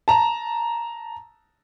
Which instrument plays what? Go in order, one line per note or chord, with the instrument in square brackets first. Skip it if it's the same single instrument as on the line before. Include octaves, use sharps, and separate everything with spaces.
[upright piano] A5 A#5